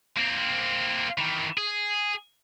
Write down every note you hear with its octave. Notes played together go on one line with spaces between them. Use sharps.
A#3 C4
D#3 E3
G#4